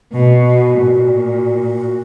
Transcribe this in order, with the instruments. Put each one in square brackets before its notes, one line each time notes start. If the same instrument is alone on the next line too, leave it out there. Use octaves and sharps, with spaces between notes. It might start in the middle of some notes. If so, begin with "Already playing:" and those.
[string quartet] B2 [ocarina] F#4
[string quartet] A#2